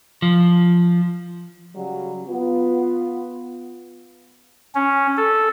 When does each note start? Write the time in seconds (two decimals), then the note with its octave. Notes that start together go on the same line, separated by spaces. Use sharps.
0.22 F3
1.76 C#3 F#3 G3
2.27 B3 F4
4.75 C#4
5.17 A4